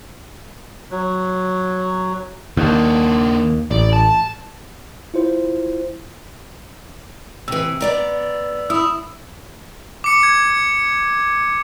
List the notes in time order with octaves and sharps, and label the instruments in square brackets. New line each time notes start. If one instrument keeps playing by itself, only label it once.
[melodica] F#3
[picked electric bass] D#2 [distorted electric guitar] D#3 D4
[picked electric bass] A1 [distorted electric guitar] D5
[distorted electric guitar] A5
[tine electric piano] E4 F4 C5
[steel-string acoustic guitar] C3 E3 [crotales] E6
[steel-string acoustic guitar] B3 D5 A#5
[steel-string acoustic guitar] E4 [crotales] D#6 E6
[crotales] D6 C#7
G#6